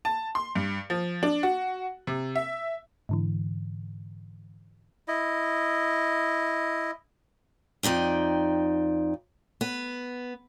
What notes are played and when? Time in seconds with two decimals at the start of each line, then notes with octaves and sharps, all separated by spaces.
0.05 A5
0.35 C6
0.56 G2
0.90 F3
1.23 D4
1.43 F#4
2.07 C3
2.35 E5
3.09 G#2 D3 E3
5.08 E4 D#5
7.83 F2 D#4 D5 G5
9.61 B3